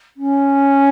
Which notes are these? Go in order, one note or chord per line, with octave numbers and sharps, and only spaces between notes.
C#4